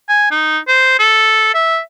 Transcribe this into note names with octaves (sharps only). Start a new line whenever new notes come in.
G#5
D#4
C5
A4
E5